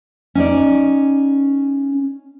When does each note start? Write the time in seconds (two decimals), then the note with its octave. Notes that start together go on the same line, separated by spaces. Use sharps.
0.35 C#4 D#4 D5